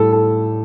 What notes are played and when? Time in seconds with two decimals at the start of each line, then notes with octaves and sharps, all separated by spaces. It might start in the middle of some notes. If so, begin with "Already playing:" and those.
Already playing: A2 G3 A4
0.13 A4